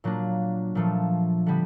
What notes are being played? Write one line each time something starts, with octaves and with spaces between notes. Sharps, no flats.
A#2 F#3 A#3 D4
A#2 F3 A3
D3 G3 B3